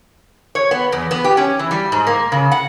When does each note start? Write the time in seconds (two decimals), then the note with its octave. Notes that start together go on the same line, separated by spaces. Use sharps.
0.55 C#5
0.71 B3
0.92 E2
1.11 B3
1.24 G4
1.37 C#4
1.59 E3
1.71 G3
1.92 G#2
2.07 A#3
2.32 C#3
2.51 F#5